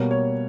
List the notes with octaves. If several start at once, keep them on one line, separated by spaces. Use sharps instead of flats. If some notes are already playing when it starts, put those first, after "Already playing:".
Already playing: B2 G3 A#3 C#5
C#5